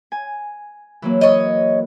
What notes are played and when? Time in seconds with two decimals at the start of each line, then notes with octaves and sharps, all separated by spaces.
0.12 G#5
1.02 E3 F#3 A#3
1.21 C#5 D#5